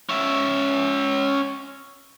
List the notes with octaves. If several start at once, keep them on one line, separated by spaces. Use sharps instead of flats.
C#4 E5